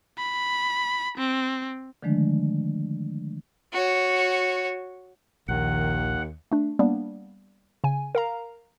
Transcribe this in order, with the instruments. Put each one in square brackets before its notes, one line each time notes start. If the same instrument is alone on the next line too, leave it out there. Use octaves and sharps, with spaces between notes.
[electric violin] B5
C4
[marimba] D3 D#3 F3 G#3 A3 D4
[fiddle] F#4 C#5
[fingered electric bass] A#1 [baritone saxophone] D#2 [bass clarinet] D#3 [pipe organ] F#5
[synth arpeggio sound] A3 D4
G3 A#3 B3 D4
C#3 G#5
A#4 F5 A#5